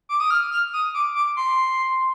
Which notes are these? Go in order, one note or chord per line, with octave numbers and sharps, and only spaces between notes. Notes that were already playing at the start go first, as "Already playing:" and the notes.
D6
D#6
F6
F6
D#6
D6
D6
C6